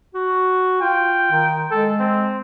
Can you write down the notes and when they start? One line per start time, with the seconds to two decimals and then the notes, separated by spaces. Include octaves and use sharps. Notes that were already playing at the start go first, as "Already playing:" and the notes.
0.15 F#4
0.81 F4 G5
1.32 D#3
1.71 G#3 A4
2.00 C4